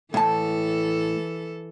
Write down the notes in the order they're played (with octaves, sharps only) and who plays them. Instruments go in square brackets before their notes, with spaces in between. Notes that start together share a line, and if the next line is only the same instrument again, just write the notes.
[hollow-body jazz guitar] A2 A5 [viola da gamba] E3 A4